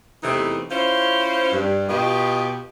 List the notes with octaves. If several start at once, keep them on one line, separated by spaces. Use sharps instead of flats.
E2 C3 E3 A3 D#4
C#4 E4 F4 C5
G2
B2 F4 G4 B4 D#5